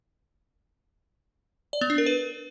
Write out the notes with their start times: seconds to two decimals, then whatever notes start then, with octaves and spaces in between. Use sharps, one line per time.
1.73 D5
1.81 B3
1.90 D4
1.98 A#4
2.06 B4